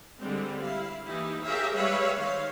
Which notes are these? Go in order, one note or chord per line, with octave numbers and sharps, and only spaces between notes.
D3 G3 G#3 C4
E4 F5
E3 A#3 D#4 E4 G4
G4 G#4 A#4 C#5 E5 F5
G3 G#3 B4 C#5 E5 F5
D#3 C5 C#5 F5